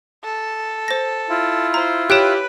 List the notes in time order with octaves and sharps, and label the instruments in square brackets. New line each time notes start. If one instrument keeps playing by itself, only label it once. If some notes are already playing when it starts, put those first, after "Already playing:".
[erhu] A4
[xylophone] C5 A#6
[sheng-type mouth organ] E4 F4
[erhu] C5 [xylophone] A#5
[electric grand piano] G4 D7 E7 [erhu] B4 [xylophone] C#5 F#6